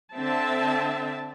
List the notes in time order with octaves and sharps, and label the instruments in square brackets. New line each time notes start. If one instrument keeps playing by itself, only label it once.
[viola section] D3 C4 E5 A5